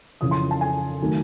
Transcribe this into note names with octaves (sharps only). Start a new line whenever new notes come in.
F2 C#3 E3 D#6
C6
A5
G#5
D#3 F#3 A3